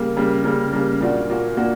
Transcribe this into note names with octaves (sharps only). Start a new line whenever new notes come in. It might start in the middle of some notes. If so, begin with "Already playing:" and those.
Already playing: C#3 G3 A#3
C#3 G3 A#3
C#3 G3 A#3
C#3 G3 A#3
A#2 A#3 D4 F#4
A#2 A#3 D4 F#4
A#2 A#3 D4 F#4